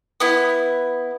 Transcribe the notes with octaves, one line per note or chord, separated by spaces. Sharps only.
B3 E4